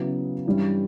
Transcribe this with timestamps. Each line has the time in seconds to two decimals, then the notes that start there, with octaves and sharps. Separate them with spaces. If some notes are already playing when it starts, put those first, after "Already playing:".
Already playing: C#3 F#3 B3 E4 B4
0.46 G2 E3 G3 C#4 E4